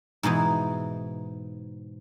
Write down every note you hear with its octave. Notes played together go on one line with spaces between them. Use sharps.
G#2 B2 E3 D#4